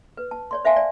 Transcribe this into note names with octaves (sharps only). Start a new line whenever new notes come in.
B4
A5
C#5 D5 C6
C5 E5 F5 G#5 A5 C6
D5